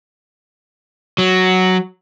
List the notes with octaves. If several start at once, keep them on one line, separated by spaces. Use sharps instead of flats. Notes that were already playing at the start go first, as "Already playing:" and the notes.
F#3